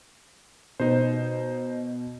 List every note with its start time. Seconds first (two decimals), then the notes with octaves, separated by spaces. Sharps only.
0.80 B2 D#4 C5